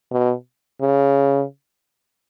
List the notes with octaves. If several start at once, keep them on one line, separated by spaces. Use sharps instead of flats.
B2
C#3